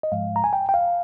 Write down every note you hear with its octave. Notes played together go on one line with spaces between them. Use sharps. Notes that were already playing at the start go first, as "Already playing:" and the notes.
D#5
G#2 F3 G#3 F5
A#5
G#5
G5
G5
F5